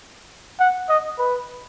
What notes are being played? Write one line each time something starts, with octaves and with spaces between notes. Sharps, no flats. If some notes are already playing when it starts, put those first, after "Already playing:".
F#5
D#5
B4